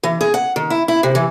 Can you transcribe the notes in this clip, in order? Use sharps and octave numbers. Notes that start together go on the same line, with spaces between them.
E3
G#4
F#5
D#3
E4
E4
C3
E3